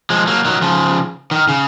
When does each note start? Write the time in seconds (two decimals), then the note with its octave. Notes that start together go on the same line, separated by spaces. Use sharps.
0.10 F3 G#3
0.27 F#3 A#3
0.45 D#3 F#3
0.62 C#3 F3
1.31 D#3
1.48 C#3